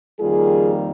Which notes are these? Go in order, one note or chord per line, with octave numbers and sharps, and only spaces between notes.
F2 D#3 G3 A#3 F4 G#4